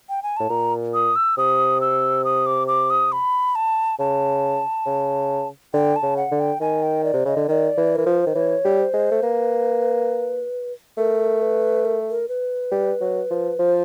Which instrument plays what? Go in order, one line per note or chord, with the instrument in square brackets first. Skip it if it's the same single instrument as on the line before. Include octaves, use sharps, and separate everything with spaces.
[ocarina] G5
G#5
[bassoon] A2 [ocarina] A5
[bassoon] A#2 [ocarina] A#5
[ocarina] D#6
E6
[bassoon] C3 [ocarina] D#6
[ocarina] E6
D#6
D6
D6
D#6
B5
A5
[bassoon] C#3 [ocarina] A5
[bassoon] C#3
[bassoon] D3 [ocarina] G5
[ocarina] A5
[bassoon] C#3
[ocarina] F#5
[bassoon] D3
[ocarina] G5
[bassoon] D#3 [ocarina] G#5
[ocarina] G5
D5
[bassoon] C3
[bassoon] C#3 [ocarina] D#5
[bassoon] D3
[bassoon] D#3 [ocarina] D5 D#5
[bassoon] E3
[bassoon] E3 [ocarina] A#4
[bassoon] F3 [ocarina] B4
[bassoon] D#3 [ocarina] C5
[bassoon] E3 [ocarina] C#5
[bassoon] G3
[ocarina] C5
[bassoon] G#3
A3
[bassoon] A#3 [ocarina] B4
[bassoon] A3 [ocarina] A#4
[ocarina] B4
A#4
A#4
B4
[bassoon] G3
F#3
F3
[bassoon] F3 [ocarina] C5